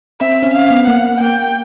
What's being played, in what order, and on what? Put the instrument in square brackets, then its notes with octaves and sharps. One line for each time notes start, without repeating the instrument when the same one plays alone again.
[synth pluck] C4 [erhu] E5
[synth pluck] C4
C#4
[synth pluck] C4 [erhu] F5
[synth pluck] B3
[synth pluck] A#3 [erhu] F#5
[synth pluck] A#3 [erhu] G5